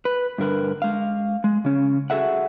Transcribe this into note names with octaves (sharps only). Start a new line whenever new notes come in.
B4
G2 D3 A#4 B4
G#3 F5
G#3
C#3 C#4
F#4 G#4 A4 E5 F#5